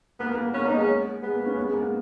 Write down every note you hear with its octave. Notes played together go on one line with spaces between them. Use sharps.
A#3 B3
A#3
A#3
B3 C#4
A#3 D#4
G#3 C#4
G#3 B3
A#3
C#4
B3
G#3
A#3
B3